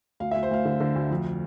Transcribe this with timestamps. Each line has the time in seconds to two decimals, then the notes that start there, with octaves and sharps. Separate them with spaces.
0.20 D2 F5
0.31 E5
0.35 D2
0.43 C5
0.51 D2 F5
0.65 D3
0.80 D3
0.96 D2
1.11 F2